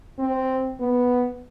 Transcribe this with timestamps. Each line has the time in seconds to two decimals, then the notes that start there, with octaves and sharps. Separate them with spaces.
0.19 C4
0.80 B3